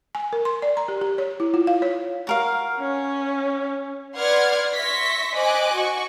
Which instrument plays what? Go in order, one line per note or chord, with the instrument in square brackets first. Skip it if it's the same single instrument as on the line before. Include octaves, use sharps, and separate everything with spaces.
[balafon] G#5
A#4
C6
D5
A#5
G4
G4
C#5
E4
F4
F5
C#5
[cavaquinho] F#4 A#4 F5
[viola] C#4
[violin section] B4 D5 F#5 C6 F6 G#6
E5 C6 C#6 A#6 B6
C5 D#5 G#5 D6 F#6
F#4 C#6